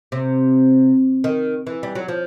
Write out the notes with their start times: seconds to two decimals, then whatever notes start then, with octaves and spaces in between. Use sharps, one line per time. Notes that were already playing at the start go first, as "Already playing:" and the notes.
0.12 C3
1.24 D#3
1.67 E3
1.83 G3
1.95 F#3
2.08 F3